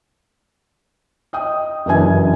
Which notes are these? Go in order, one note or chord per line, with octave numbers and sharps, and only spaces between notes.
D#5 G5 D#6
F#1 G2 E3 F#4 G#5 G#6